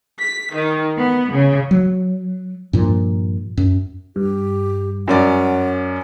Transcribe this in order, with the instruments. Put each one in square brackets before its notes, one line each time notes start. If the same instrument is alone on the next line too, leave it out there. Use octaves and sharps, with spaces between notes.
[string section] B6
D#3
B3
C#3
[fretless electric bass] F#3
G2 A#2 F3
F#2
[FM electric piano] G2 [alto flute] G4
[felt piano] F#2 C#4 D5 [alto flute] F#5